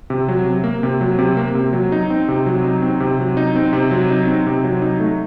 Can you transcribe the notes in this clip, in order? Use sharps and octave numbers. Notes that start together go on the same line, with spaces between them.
C3
F#3
C3
A#3
C3
F#3
C3
A#3
C3
F#3
D#4
C4
C3
F#3
D#4
C4
C3
F#3
D#4
C4
C3
F#3
D#4
C4
C3
F#3
D#4
A3